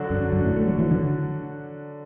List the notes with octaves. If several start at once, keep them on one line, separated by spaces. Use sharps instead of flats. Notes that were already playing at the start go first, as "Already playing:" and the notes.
Already playing: D3 F#3 D4 F#4
F#2
F#2
A2
A3
F#3
E3
D3